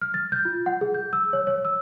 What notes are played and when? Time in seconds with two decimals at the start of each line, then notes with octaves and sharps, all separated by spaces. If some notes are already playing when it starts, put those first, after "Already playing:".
0.01 F6
0.14 A6
0.32 G6
0.45 F4
0.66 F#5
0.81 G#4
0.94 G6
1.13 E6
1.33 C#5
1.47 C#5
1.65 E6